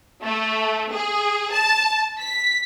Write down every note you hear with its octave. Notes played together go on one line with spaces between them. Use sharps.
A3
G#4
A5
B6